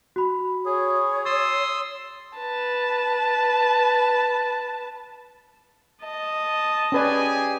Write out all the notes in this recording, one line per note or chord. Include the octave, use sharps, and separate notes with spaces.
F#4 B5
G#4 C#5
C6 D#6 E6 A6
B4 A5
D#5 A5
C#4 G4 G#4 B4 D5 G#5